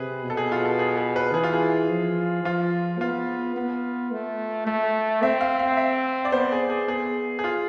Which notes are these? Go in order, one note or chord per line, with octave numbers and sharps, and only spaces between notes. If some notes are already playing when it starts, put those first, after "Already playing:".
Already playing: C3 G#4 B4
B2
A4
G#4
F4
A4
G#4
G#4
B4
E3 G#4
F4
G#4
F3
F3 F4
B3 F4
B3
A3
A3
C4 E5
F5
F5
E5
D5
B3 C5
G#4
G#4
B3 G#4
G#4
F4